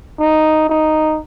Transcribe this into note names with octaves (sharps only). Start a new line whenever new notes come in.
D#4
D#4